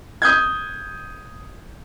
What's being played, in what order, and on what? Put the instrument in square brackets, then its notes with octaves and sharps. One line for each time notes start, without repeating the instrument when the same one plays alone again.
[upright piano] D#6 G6 G#6